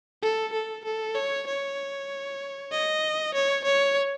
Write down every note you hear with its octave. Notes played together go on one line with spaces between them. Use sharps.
A4
A4
A4
C#5
C#5
D#5
C#5
C#5